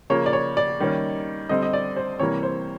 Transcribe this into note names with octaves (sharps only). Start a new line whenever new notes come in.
C#3 F3 A#3 C#5
D5
C#5
D5
D#3 G3 A#3 C#4
D3 G3 C4 D#5
D#5
D5
C5
C3 E3 G3 A#3 C#5
C5